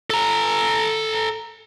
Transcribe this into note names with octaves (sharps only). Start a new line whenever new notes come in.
A4 A#5